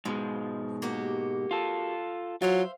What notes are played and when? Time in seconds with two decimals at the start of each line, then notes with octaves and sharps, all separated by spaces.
0.05 G#2 B2 F3 G#3
0.82 A#3 F#4 G4
1.51 F4 A4
2.42 F#3 F4 C5 E5 F5